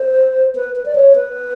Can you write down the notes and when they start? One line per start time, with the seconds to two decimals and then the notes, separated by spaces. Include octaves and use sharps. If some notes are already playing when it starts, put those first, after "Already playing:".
Already playing: C5
0.55 B4
0.76 B4
0.85 D5
0.95 C#5
1.15 B4